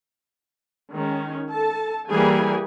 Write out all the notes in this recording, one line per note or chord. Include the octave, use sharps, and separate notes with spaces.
D#3 G#3 C#4
A4 A5
E3 G3 A#3 G#4 G#5